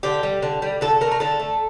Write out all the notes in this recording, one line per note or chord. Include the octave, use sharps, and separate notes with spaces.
D3 G4
G3
D3
G3
D3 A4
A3 A#4
A#4
D3 A4
A3